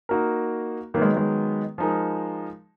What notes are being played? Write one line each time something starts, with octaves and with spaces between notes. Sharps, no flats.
A#3 D#4 F#4 A#4
D#3 F#3 A#3 B3
G#3
G#3
F3 G#3 D#4 A#4